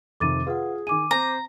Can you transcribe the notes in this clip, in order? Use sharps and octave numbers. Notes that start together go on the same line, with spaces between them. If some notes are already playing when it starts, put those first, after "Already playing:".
F2 C3 D#3 D6 A6 D#7
F4 G#4 B4 F#5
D#3 G#5 D6 D#7
C4 C5 A#5